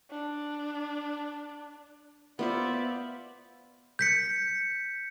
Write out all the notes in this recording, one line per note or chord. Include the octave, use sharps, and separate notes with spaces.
D4
B3 F4 C5 D5 E5
G6 B6 C#7